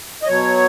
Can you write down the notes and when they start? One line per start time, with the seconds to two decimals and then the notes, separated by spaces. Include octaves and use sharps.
0.23 D#5
0.27 B2 F#3 C#5